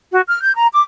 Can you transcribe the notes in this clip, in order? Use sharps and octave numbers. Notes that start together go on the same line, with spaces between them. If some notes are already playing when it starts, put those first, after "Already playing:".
F#4
F6
G6
A#5
D6